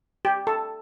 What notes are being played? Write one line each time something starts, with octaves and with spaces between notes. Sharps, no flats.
G4
A4